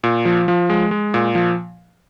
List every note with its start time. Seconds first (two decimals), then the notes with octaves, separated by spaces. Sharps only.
0.03 A#2
0.25 F3
0.48 F3
0.70 G#3
0.91 G#3
1.14 A#2
1.35 F3